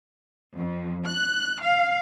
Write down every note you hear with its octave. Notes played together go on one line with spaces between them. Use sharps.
F2
F#6
F5